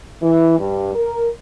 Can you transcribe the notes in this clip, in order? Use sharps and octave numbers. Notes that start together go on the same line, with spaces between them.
E3
G2
A#4